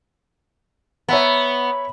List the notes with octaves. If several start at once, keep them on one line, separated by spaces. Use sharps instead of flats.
B3 C#5 E5 A#5